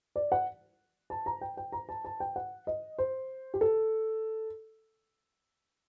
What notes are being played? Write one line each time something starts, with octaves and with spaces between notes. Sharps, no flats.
D5
F#5
A5
A#5
G5
G5
A#5
A5
A5
G5
F#5
D#5
C5
G4
A4